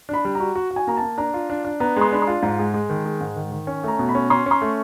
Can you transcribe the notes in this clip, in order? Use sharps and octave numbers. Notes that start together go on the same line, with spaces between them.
D4 B5
G3
F#4 A#5
F#4
F#4
G#5
A#3 A#5
A5
A#3
D4 A#5
F4
D4
D4
B3 A#5
G#3 C6
D4 B5
C6
F4
G#2 A#5
G#3
G#3
D#3
G#3
G#2
D#3
D#3
C#4
A3 A#5
B2
B5
C#4
C#4 C6
C#4 C6
A3